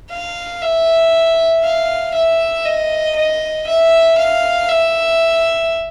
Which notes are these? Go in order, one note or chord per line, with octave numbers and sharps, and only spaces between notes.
F5
E5
F5
E5
D#5
D#5
E5
F5
E5